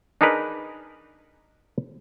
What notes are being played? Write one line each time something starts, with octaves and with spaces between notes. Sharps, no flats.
D4 D#4 G#4 A#4 B4